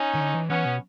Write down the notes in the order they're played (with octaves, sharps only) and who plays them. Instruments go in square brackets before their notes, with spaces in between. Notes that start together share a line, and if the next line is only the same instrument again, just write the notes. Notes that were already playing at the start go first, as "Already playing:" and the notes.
Already playing: [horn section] C#4 D#4
[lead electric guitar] D#3
D3
E3
[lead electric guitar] E3 [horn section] B3 C#4
[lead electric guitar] B2